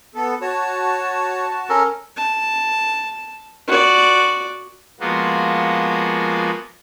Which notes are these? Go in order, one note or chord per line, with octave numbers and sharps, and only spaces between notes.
B3 A4
F#4 C#5 A5
C#4 A4 A#4
A5
F#4 D5
F3 G#3 A#3 B3 F4 F#4